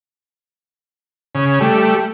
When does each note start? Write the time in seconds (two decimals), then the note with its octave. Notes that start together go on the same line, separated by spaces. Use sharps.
1.35 C#3
1.61 G3 A3